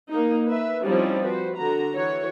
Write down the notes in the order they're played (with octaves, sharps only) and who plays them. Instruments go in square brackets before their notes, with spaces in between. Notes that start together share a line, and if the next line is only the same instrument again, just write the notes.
[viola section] A#3 D#4
B4 E5
F3 G3 C4 C#4 D#4 E4
F#4 B4 C5
D3 F#4 A#5
E3 F#4 C#5